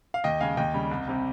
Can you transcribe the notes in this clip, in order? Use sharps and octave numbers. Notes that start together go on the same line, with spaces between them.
F5
D#2 D#5 G5
C#3 G#3 F5 G#5
D#2 D#5 G5
C#3 G3
C2
C3 G3